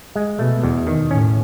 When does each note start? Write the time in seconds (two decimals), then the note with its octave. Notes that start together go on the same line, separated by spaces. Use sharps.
0.16 G#3
0.39 B2 A3
0.63 E2
0.87 D#3
1.11 A2 C#4